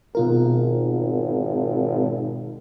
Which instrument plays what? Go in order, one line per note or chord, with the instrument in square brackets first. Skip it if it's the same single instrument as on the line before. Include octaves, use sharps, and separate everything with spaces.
[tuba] G#1 [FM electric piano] B2 F4 A#4